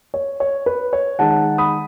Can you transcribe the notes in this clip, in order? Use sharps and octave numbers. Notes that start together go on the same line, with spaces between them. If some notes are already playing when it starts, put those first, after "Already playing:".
C#5
C#5
B4
C#5
D#3 G#3 D#4 F#5 A5
B5 D#6